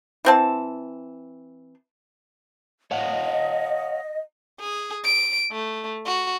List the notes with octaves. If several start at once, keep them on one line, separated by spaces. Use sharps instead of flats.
E3 C4 A5
C#5 D#5 F5 F#5
G#4
D7
A3
F#4